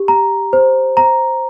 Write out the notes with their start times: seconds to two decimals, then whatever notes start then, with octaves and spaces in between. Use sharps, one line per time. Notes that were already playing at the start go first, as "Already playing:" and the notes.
Already playing: G4
0.08 A#5
0.53 C5
0.97 A#5